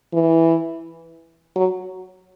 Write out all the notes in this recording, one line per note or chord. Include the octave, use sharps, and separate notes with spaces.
E3
F#3